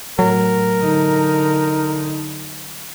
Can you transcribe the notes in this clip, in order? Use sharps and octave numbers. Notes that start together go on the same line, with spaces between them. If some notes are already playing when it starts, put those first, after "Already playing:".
A2 F#3 A#4
D3 D#4